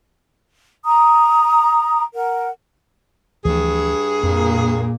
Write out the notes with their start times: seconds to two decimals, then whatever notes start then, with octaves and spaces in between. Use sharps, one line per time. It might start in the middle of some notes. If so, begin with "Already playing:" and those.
0.85 A#5 D#6
2.15 A#4 F#5
3.45 D2 G2 E3 F3 G#4
4.23 F2 A#2 A#3